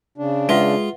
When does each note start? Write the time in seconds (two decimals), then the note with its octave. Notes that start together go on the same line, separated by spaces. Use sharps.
0.18 C#3 D4
0.49 G#3 F4 B4 E5 F#5